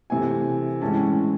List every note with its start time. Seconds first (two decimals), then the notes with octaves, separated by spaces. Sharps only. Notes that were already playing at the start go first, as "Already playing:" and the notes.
0.10 C3 E3 A3 G#5
0.81 A2 E3 G#3 C#4 A5